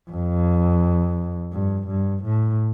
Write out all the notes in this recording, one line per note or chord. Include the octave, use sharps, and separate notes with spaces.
F2
G2
G2
A2